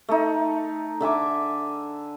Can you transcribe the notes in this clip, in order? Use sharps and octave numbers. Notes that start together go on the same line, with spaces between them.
A3 D#4
D3 E5 G#5 D6